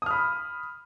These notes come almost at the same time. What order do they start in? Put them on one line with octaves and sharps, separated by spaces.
D#6 F6 B5